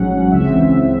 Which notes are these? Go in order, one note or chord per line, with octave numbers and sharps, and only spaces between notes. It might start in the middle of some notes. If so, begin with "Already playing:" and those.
Already playing: A1 G#2 F#3 C#4 F#5
C#2 C#3 E3 C4 E5